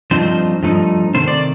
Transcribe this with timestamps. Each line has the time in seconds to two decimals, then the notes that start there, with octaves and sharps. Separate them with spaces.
0.11 G2 F3 A3 C4 D#4 C5
0.63 G2 F3 A3 D#4
1.14 C3 D#3 A3 C5
1.28 D5